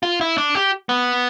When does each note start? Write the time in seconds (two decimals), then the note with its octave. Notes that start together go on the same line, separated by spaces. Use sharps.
0.03 F4
0.21 E4
0.38 D4
0.55 G4
0.89 B3